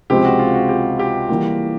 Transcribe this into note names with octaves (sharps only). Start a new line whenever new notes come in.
C#2 C3 F3 G#3 C4 G4
F#4
F4
F#4
G4
G4
E3 G3 A#3